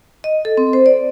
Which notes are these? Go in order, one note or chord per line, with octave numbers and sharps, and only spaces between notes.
D#5
A4
C4
C5
D5